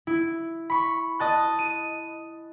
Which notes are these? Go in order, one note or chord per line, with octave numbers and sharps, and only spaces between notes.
E4
B5 C#6
D#5 A5 F#6
D#7